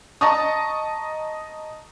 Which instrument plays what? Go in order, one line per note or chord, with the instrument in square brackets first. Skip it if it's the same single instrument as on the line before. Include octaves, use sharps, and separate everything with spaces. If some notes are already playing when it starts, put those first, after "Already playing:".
[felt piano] D#5 A5 A#5 C#6 D#6